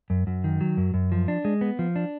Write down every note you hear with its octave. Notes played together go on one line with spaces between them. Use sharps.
F#2
F#2
D#3
F#3
F#2
F#2
F3
D4
G#3
B3
F3
D4